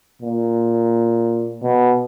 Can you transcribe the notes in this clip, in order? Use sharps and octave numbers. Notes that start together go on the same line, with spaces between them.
A#2
B2